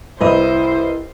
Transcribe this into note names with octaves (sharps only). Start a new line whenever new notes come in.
C2 E4 B4 C5 D#5 E5